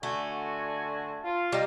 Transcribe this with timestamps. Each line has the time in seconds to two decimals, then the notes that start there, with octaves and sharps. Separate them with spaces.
0.03 D3 A3 F#4 G#5
1.24 F4
1.52 G3 D#4